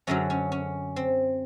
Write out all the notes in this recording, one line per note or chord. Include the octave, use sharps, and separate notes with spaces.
F#2 D3 F#3 C#4
C#4
C#4
C4